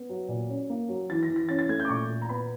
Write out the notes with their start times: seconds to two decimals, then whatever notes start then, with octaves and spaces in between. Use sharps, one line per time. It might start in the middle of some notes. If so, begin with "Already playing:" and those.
Already playing: B3
0.09 F#3
0.28 A#2
0.49 C#4
0.70 A#3
0.89 F#3
1.09 E3 A6
1.23 A#6
1.29 E3
1.36 A#6
1.49 C#4 A6
1.59 A6
1.69 A3 G#6
1.80 G6
1.85 D6
1.89 A#2 C#6
2.09 A#2
2.22 A#5
2.29 B3 B5